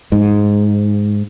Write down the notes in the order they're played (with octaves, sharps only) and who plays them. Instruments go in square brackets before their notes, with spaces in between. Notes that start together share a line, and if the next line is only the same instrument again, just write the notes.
[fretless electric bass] G#2